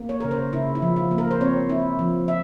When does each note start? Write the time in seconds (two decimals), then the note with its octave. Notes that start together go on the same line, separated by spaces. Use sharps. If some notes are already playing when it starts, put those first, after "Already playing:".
Already playing: A#3
0.09 C#5
0.20 C#3 A#4
0.31 C5
0.53 C#3 E4
0.75 E4
0.82 F3
0.96 F4
1.11 A#3
1.18 A#4
1.31 C5
1.41 C4 C#5
1.69 E4
1.99 F3
2.28 E5